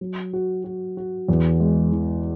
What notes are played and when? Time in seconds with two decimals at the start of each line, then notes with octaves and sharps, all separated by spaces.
0.01 F#3
0.33 F#4
0.64 F#4
0.97 F#4
1.28 E2
1.60 G#3
1.92 E3